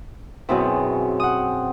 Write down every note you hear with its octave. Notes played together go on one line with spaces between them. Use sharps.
F#2 B2 C4 E4 G#4 C#5
C4 F#5 D#6